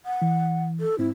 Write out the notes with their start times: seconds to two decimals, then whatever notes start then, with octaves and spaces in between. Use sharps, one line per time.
0.06 F#5
0.22 E3
0.80 A4
0.99 G#2 C4 E4